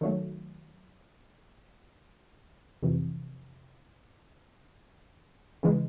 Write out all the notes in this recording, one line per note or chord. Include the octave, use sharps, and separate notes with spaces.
D#3 F#3 A3
F2 C3 E3
C#3 E3 G#3